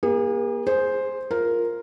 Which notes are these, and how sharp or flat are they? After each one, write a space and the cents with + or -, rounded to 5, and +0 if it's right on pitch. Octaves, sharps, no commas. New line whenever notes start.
A#3 +35 G#4 -40
G#4 +0 C5 +0
F4 +0 A#4 +0